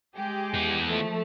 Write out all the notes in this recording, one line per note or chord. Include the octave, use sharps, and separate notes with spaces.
G#3 G4 G#4 D6
E3 B3
F3 A3